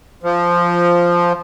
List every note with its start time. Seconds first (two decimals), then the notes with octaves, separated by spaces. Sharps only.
0.23 F3